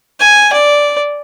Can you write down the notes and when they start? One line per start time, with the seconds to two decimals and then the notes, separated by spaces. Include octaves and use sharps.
0.20 G#5
0.53 D5